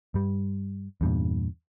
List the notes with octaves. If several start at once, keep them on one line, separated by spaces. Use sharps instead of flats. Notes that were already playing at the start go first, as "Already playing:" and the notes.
G2 G3
E2 G2 A#2